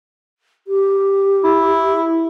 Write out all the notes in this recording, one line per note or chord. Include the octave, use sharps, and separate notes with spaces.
G4
E4